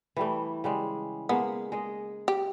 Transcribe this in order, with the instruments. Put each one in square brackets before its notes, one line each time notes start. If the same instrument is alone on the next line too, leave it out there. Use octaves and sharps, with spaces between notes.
[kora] E3 G3 A3
C#3 G3 G#3
[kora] G#3 A#3 [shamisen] B3
[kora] G#3 D#5
[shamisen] G4